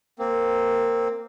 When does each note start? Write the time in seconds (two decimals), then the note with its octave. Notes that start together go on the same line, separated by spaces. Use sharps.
0.19 A#3 C4